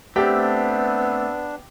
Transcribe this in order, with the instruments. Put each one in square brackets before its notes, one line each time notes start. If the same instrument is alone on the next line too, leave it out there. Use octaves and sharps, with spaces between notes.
[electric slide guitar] A3 C4 [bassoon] B3 [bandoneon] D4 [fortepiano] G4